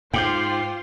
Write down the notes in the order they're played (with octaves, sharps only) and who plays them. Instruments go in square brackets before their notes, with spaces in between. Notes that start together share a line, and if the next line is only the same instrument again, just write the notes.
[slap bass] G#2 [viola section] F4 C5 C6 [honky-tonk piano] G5 D6 G6